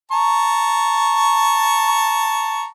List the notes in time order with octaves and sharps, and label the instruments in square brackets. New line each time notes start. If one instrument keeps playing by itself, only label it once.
[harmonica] A5 A#5 C#6